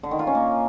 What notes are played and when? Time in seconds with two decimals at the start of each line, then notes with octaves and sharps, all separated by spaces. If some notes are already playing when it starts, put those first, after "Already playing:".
0.03 D3
0.11 D#3
0.19 F4
0.27 C#4
0.35 A#3